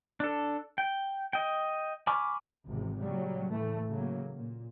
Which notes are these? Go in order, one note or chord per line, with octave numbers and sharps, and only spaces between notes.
D4 A4
G5
D#5 G5
G#5 B5 C#6 D6 F6
G#1 E2 C3
A#2 C#3 F#3 G3
A2 E3 A3
C#3 F#3 A#3
A#2